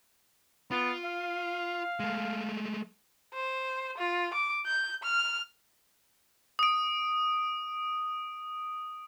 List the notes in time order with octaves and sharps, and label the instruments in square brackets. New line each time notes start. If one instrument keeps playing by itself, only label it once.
[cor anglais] B3 [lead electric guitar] F4
[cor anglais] F5
[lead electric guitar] G#3 A3
[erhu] C5
F4
D6
G6
F6
[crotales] D#6 D7